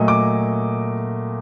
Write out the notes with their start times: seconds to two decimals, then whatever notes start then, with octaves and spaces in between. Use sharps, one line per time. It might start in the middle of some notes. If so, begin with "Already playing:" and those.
Already playing: A#2 F#3 A3 D#5
0.08 D6